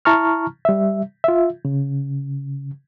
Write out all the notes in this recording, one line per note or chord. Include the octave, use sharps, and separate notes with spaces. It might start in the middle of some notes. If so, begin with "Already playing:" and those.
E4 A5 A#5 C#6 F6
G3 E5
F4 E5
C#3